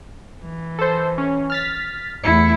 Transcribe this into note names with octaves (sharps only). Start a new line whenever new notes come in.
E3
A4 C5
C#4
F6 A6 B6
E2 A3 E4 C#7